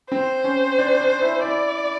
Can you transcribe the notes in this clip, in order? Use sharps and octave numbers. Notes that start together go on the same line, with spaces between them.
C4 C5
C#4
D4
D4
E4
E4 D5